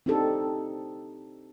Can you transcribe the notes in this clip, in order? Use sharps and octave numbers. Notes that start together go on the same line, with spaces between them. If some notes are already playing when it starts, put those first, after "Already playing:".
C4 D4 D#4 G4 A4